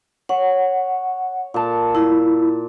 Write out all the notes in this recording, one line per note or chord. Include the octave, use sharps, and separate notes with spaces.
C#5 F#5
A#2 A5
E4